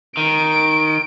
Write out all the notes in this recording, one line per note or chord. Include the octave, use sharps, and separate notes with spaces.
D#3 D7